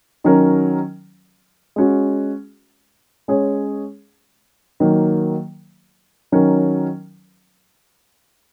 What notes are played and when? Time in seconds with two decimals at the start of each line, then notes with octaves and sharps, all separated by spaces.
0.24 D#3 F#3 C#4 A#4
1.76 G#3 C#4 F#4
3.28 G#3 C#4 G#4 C#5
4.80 D#3 F#3 A#3
6.32 D#3 F#3 C#4 A#4